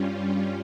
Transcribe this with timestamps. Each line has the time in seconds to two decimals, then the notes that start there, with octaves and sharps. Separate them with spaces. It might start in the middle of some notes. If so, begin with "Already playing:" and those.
Already playing: G2 G3 C#4 F4